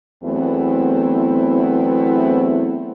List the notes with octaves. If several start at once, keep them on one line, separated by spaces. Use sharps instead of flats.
E2 F#3 A3 B3 C4 E4